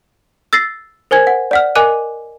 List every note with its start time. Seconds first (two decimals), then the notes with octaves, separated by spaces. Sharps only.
0.53 E6 A6 A#6 C7
1.11 A#4 C5 G#5 G#6
1.27 F#5
1.51 D5 F#5 F6
1.75 A#4 D#5 G#5 D6 F#6 D#7